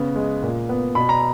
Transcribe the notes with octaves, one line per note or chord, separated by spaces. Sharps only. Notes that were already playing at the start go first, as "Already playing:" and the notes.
Already playing: C#3 B3
G#3
A#2
B3
B2 B5
A#5